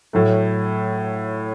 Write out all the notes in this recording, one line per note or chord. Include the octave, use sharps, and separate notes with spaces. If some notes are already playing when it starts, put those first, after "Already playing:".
A2 F#3 A3